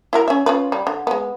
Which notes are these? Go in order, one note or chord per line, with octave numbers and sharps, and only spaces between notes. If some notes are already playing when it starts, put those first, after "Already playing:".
E4 F#4 A#4
C#4 E5
C#4 F4 B4
G3
D3
G#3 B3